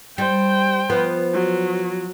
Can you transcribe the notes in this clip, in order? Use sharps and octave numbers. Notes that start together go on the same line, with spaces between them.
G3 C5 G5
F3 B3 B4
F#3